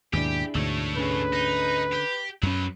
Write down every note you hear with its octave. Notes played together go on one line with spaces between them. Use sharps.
D#2 G#2 B2 D4 E4 G4 G#4
D2 G#2 B2 A3 C#5
D3 C#4 G#4 B4
D#4
G4
F#2 F#3 C#4 B4